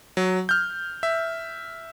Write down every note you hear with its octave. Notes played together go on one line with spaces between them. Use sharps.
F#3
F6 G6
E5